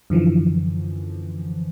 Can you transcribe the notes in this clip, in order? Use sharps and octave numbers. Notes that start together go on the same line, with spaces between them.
F#2 D3 E3 F3